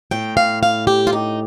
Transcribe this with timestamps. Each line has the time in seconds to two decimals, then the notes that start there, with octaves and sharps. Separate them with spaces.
0.11 A2 G5
0.37 F5
0.63 F5
0.87 G4
1.07 F4
1.13 D#4